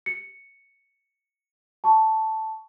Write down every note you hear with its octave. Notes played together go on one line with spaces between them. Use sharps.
C#7
A5 C#6